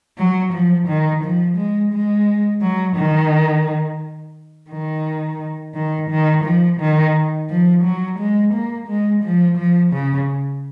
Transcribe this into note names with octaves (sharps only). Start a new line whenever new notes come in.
F#3
F3
D#3
F3
G#3
G#3
F#3
D#3
D#3
D#3
D#3
F3
D#3
F3
F#3
G#3
A#3
G#3
F3
F3
C#3